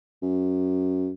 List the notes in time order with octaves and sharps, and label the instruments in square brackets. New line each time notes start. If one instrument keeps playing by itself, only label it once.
[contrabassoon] F#2